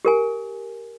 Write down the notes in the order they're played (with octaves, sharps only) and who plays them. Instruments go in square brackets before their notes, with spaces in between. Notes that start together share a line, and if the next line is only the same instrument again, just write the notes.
[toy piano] G4 A#4 G#5